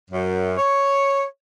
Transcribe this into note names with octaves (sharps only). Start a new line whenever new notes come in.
F#2
C#5